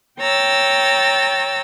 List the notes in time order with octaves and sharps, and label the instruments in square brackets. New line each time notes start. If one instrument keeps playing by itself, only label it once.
[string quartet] C#5 G5 A#5 E6 A6